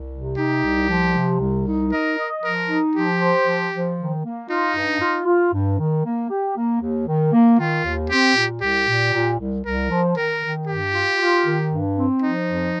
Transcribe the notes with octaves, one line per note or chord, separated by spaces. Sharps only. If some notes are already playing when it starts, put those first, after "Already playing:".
Already playing: C2
C3
D#4 G4
C2
F3
C3
C2
D#4
A#4 D#5
D#5
F3 A#4
D#4
F3 G4
C5
F3
F3
D#3
A#3
D#4 F4
G2
F4
F4
G2
D#3
A#3
G4
A#3
D#2
D#3
A#3
D#3 F4
D#2
C4 G4
A#2
C2 G4
A#2
A#2
C2
C2 A#4
F3
D#3 A#4
D#3
G2 G4
F4
F4
D#3
G2
C4
F3 D#4
F2